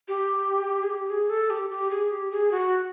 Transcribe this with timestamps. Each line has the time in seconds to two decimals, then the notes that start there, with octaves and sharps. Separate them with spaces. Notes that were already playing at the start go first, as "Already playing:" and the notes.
0.08 G4
0.83 G#4
0.90 G4
1.10 G#4
1.30 A4
1.50 G4
1.70 G4
1.91 G#4
2.11 G4
2.31 G#4
2.52 F#4